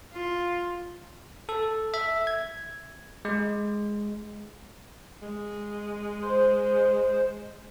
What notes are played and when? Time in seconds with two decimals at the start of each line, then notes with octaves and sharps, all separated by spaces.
0.13 F4
1.49 A4
1.94 E5
2.27 G#6
3.25 G#3
5.22 G#3
6.23 C5